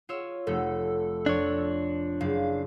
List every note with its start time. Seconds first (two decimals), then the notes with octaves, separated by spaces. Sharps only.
0.09 F4 C#5 E6
0.47 F1 A3 A4
1.26 F2 D4 C#5
2.21 F#1 F5